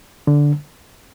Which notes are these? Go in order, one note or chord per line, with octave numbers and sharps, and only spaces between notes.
D3